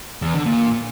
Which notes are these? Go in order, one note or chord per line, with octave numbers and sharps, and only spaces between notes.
E2
D3
A#2